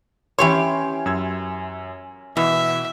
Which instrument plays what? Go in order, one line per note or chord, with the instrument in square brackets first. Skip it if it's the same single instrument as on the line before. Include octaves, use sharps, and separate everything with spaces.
[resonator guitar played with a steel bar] E3 G4 C#5 [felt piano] C#4 G#5 C6
[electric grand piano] F#2 E6 G#6
[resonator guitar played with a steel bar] B2 [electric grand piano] E3 [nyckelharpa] E5